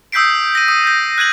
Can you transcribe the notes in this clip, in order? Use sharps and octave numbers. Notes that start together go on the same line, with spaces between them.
D#6 E6 G6 B6 C7 D7
A#6 D#7
D#6 D#7
G6 A#6
F#6 G#6 D#7 F#7